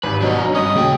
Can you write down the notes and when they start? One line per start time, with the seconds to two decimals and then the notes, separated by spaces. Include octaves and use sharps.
0.03 G#1 G2 B4
0.22 B2 F#3 D4 C#5
0.38 A#5
0.55 G2 C#4 F#4 C#5 D#5 D#6
0.76 D#1 C#3 A#3 G5